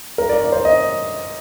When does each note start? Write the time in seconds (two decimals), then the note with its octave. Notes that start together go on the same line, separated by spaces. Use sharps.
0.18 A#4
0.29 D5
0.41 D5
0.52 C5
0.65 D#5